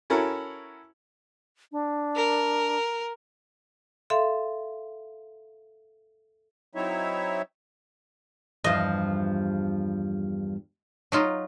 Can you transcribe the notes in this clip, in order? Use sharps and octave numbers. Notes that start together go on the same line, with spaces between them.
C#4 E4 F#4 A4 A#4 A#5
D4
A#4
A4 E5 F5 C6
F#3 C4 D#4 E4 C#5 E5
E2 G2 F3 D#5
F#3 D#4 F4